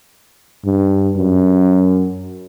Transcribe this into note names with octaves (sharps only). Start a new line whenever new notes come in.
G2
F#2